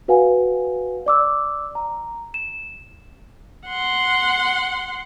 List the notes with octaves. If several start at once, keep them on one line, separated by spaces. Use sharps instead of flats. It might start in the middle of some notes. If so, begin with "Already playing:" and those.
F#4 B4 F5 F#5 G#5
D5 D6 E6
A#5
E7
F#5 C6